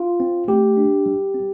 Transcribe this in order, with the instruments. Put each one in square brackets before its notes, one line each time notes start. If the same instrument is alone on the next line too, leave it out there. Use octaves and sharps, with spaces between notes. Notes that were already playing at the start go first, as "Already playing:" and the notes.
Already playing: [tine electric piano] F4
C4
A3 G4
D4
G3
C4